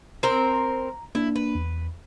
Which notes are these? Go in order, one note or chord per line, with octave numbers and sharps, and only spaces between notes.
C4 A#4
A#5
A#3 D4 E4
B4
E2